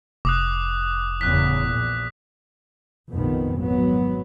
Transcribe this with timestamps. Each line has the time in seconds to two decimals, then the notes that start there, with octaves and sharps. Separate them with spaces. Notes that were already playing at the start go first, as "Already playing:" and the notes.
0.25 F1 D6 D#6 F#6
1.21 A1 E2 C#3 F#6 B6
1.65 A#1 A#2
3.11 F1 A#1 F2 A#2 D#3 B3
3.57 G#1 F#3 B3